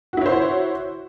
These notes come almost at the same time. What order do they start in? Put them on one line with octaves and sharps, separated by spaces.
F#4 E4 C#5 C5